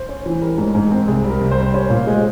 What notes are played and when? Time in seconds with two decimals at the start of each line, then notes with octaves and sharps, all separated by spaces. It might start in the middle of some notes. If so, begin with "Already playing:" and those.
Already playing: C5
0.09 C#4
0.26 E3
0.41 G3 A#4
0.58 G#2
0.75 G#2
0.91 C4
1.08 C2 G#4
1.24 G3
1.30 A#4
1.41 C2
1.51 C5
1.58 G3
1.74 C#4 C5
1.90 A#2
2.07 G#3